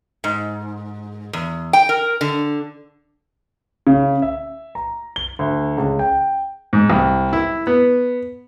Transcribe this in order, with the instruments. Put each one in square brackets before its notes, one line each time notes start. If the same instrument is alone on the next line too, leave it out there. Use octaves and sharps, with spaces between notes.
[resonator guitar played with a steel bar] G#2
E2
G5
A#4
D3
[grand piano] C#3
E5
A#5
G7
D2
C#2
G5
[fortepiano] G#2
C2
E4
B3